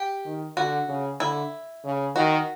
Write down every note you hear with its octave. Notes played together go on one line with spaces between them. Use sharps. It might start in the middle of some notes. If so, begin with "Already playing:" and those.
Already playing: G4
D#3
D3 F#4
C#3
D3 E4
C#3
D#3 F#4